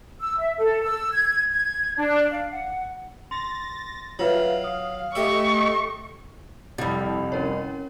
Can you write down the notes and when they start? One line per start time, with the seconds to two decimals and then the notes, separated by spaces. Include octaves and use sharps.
0.21 E6
0.38 E5
0.58 A4
0.84 E6
1.13 G#6
1.49 G#6
1.96 D4
2.30 F5
2.51 F#5
3.31 C6 A6 A#6
4.19 F#3 F4 B4 E5 F5
4.64 D#6
5.15 A3 G4 D#5 E5 C#6
6.78 C2 F2 G3 B5
7.32 C#4 A#4 C#5